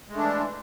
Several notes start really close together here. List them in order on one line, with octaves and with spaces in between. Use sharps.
G#3 A3 D4 E3